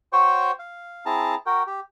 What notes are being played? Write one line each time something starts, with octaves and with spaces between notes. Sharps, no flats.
F#4 C5 C#5 G5 C#6
F5
C4 E4 G#4 A5 A#5
F#4 A#4 G5
G4